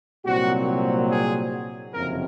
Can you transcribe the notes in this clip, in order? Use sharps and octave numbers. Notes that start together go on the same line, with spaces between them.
C2 A#2 F#3 C4 F#4
G#4
F#1 F2 C3 D#3 A#4